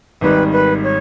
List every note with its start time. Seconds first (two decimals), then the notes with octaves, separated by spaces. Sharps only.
0.21 G#1 G#2 D#3 G3 B4
0.53 B4
0.84 C#5